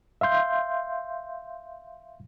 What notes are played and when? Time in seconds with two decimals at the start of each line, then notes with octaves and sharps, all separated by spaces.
0.21 E5 F5 C6 G6